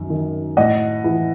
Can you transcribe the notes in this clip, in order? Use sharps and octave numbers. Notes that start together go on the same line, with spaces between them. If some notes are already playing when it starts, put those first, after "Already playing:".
Already playing: F#2 D#3
D#3
A2 D#5 F#5
E3